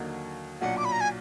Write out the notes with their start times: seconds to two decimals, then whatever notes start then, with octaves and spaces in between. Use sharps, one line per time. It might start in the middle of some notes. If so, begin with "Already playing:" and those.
Already playing: D#2 D3 F#3 A#3 D#4
0.61 B1 A#2 F#3 D4 F#5
0.77 D6
0.85 B5
0.92 A#5
1.01 G#5